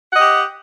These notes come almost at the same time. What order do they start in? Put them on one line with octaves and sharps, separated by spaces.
F#5 D#5 G4